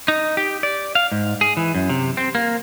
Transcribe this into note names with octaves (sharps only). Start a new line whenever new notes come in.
D#4
G4
D5
F5
G#2
G#4
E3
F#2
C3
C4
A#3